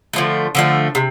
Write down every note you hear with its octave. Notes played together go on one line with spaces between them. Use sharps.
D3 F3 A3
D3 F3 A3
C3